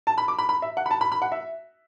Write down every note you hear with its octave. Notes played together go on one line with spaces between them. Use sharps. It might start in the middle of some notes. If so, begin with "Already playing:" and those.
A5
B5
D6
B5
B5
E5
F#5
B5
A5
B5
B5
F#5
E5